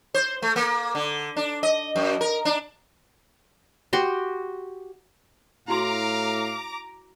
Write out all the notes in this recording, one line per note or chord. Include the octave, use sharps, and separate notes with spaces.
C5
A3
A#3
D3
D4
D#5
F#2
A#4
D4
F#4 G4 C6
A2 E4 F#4 F5 A#5 C6 D6